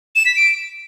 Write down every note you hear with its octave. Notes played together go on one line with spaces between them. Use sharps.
E7
B6
D7